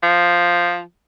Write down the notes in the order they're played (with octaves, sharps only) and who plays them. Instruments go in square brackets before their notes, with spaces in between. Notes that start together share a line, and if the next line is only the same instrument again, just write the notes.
[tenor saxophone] F3